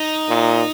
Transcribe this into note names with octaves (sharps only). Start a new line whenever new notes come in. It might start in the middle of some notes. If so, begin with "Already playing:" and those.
Already playing: D#4
A#2